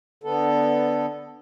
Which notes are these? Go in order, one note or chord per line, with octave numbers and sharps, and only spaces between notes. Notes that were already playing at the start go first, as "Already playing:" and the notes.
D3 B3 A4